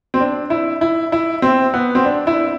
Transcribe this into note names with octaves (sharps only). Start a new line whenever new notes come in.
C4
D4
E4
E4
E4
C4
B3
C4
D4
E4